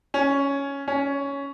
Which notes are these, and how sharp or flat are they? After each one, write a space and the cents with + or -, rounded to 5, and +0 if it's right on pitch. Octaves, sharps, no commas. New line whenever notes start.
C#4 +5
C#4 +10